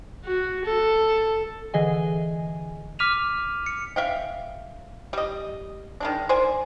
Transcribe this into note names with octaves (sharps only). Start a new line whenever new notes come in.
F#4
A4
D3 E3 G#4 D#5 G#5
D6 F6 B6 D#7 F7
C#7
E5 F5 G5
G3 D#5
D#3 G#3 D4
C5 D5 G#5